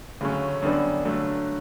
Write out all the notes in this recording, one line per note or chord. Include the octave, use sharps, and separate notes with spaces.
D2 C#3 F#3 A3 C#4
F#2 D3 G3 B3 D4
G2 D3 F#3 A3